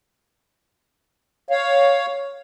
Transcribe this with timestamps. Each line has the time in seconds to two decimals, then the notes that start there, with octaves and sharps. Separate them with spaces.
1.51 C#5 F5